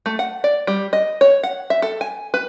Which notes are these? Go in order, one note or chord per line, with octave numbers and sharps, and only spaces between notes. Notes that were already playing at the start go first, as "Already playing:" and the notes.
A3
F#5
D5
G3
D#5
C#5
F#5
E5
A4
G#5
B4